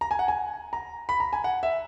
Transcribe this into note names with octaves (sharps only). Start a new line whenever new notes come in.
A#5
G#5
F#5
G#5
A#5
B5
A#5
G#5
F#5
E5